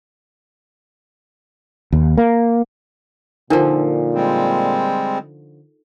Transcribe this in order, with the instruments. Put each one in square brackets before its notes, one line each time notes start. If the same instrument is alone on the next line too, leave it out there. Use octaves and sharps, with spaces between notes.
[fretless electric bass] D#2
A#3
[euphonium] A#2 [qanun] D3 F3 [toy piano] D4 D#4 A#4
[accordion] G3 G#3 C4